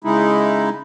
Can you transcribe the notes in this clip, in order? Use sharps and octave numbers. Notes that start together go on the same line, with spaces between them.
C#3 G#3 D#4 E4